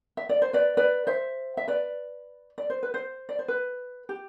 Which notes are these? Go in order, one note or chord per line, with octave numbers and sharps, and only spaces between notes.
E5
D5
C5
B4 D5
B4 D5
C5 E5
E5
B4 D5
D5
C5
B4
C5
D5
C5
B4
G4